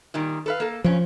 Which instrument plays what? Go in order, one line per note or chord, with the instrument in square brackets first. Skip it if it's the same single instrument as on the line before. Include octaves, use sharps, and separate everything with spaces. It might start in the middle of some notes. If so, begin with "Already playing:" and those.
[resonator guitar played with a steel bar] A#2 D#3 G3
A4 B4 F5
A#3 A4
[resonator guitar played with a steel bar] G2 C#4 [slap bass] F3